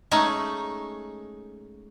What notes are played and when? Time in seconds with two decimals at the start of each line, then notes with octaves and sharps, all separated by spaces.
0.11 G#3 A3 C#4 D#4